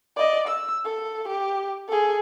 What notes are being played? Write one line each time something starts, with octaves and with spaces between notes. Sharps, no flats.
D5 D#5
E6
A4
G4
G#4 A4